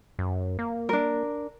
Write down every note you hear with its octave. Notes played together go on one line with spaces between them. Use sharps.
F#2
A#3
D4 A#4